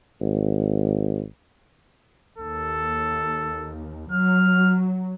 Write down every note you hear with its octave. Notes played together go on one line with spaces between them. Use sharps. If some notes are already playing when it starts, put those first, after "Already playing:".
G#1
D#2 A4
F#3 F6